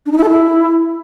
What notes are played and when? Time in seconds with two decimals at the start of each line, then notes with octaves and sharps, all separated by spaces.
0.06 D4
0.12 D#4
0.18 E4
0.24 A4
0.30 E4